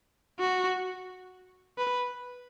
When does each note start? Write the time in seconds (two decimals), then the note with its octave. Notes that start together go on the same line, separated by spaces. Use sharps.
0.39 F#4
1.78 B4